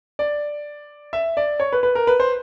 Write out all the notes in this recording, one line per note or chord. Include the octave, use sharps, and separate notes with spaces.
D5
E5
D5
C#5
B4
B4
A#4
B4
C5